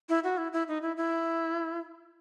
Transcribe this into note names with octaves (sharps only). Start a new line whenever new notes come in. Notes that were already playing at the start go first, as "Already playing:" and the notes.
E4
F#4
E4
E4
D#4
E4
E4